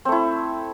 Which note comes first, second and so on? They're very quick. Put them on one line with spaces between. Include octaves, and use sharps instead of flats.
C4 A3 E4